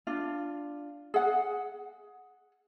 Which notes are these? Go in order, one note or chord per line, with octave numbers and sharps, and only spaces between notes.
D4 F4
G#4 F#5